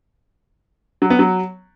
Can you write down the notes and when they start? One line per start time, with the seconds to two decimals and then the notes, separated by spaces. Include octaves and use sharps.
1.02 F#3
1.10 B3
1.19 F#3